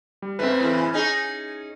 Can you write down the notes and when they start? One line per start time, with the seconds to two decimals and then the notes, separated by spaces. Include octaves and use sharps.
0.22 G3
0.39 G#2 C#3 A3 C4 B4
0.60 A2 C#3 E3
0.80 G#5
0.93 C#4 D#4 G#4